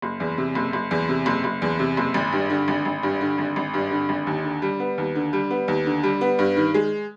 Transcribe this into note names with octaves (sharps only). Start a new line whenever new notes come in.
F#1
E2
C3
F#1
F#1
E2
C3
F#1
F#1
E2
C3
F#1
G#1
G2
D3
G#1
G#1
G2
D3
G#1
G#1
G2
D3
G#1
D#2
D3
G3
B3
D#2
D3
G3
B3
D#2
D3
G3
B3
G2
D#3
G#3